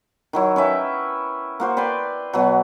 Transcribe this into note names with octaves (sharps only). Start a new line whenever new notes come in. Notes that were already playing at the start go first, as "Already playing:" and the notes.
D#3 F#3 E4
C#4 B4 E5 G5
A#3 F#4 C5
B4 D5 G5 C6
B2 F#3